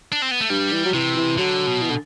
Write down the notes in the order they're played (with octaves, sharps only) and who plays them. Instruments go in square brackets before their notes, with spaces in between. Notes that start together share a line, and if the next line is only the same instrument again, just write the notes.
[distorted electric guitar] D4
C4
B3
A3
[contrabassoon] G2 [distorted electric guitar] G3
[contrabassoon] E3
F#3
[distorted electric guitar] C3 [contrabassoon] E3
[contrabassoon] E3
[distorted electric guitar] D3 [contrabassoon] F#3
[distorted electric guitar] B2
[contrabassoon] E3
D3